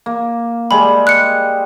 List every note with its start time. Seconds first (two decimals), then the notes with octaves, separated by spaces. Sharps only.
0.06 A#3
0.71 G3 G#3 B5
1.07 F#6 C#7